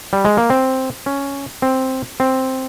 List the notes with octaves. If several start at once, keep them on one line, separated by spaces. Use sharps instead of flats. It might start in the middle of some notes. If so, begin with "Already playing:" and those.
G3
G#3
A#3
C4
C#4
C4
C4